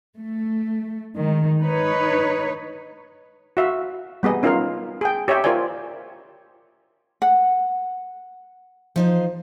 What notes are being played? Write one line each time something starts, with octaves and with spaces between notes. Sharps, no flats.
A3
D#3 G#3
D#4 B4 C#5
F#4 E5 F5
G3 B3 G#4 D#5
C#4 D#4 F4 A#4 D#5 F5
G#4 G5
G4 C#5 D#5 E5 G5
F4 A#4 C5 D5 G#5
F#5
F3 D#4 C5